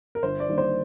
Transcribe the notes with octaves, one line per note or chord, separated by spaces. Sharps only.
A#4
G1 C5
D5
G2 D#3 G3 A#3
C5